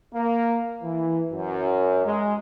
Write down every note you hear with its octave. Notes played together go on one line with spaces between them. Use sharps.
A#3
E3
F#2
G#3